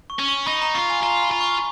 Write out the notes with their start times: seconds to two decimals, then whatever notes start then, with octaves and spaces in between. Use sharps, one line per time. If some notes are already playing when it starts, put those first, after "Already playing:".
0.10 C#6
0.19 C#4
0.28 C#6
0.46 D#4 B5
0.62 A#5
0.75 F4 C#6
0.90 G#5
1.03 F4 A#5
1.23 B5
1.31 F4
1.41 C#6